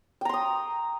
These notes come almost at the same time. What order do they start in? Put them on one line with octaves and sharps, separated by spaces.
G5 A#5 C6 D#6